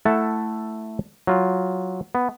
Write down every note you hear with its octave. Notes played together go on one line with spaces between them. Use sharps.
A3 E4 A4 F#5 A5
F#3 F4
B3